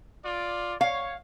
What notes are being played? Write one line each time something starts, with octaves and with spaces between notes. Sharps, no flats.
F4 D5
C#5 F5